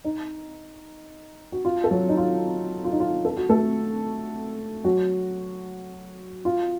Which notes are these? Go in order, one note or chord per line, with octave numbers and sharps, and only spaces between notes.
D#4
F#4
F4
A4
F#3 F#4
D#4
F4
F4
D#4
F4
A4
F#4
A3 A4
F#3 F#4
F4